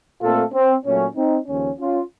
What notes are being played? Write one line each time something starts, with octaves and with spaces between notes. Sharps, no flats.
A#2 A3 C4 F4 A4
C4
A#2 F#3 A3 C#4
C4 D#4
D#2 C#3 F3 C#4
C#4 F4